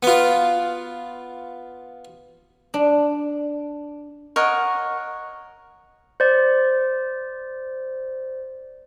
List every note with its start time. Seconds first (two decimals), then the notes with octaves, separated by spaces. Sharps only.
0.03 B3 F4
2.74 D4
4.36 A#4 C#5 D#5 F#5
6.20 C5 D5